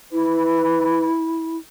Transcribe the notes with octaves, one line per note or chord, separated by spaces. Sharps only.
E4 B4